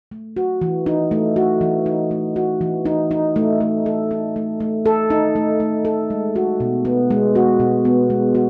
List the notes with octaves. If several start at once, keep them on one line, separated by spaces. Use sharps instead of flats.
A3
F#4
E3
D#4
A3
F#4
E3
D#4
A3
F#4
E3
D#4
D#4
A3
A3
A4
D#4
A3
A3
A4
D#4
A3
A3
A4
G#3
F#4
B2
B3
G#3
F#4
B2
B3
G#3
F#4